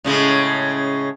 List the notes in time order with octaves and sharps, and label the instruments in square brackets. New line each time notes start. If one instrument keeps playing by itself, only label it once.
[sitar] A2 C#3 G#3